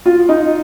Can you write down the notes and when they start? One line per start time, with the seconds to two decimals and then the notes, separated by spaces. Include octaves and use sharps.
0.06 F4
0.29 D#4